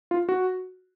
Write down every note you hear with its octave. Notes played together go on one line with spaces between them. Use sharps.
F4
F#4